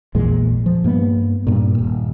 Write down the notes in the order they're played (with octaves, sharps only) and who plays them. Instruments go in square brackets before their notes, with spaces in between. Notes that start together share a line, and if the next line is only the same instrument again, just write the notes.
[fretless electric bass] A#1 E2 A#2 G#3
F3
G2 A#3 B3
G2 A#2
D#1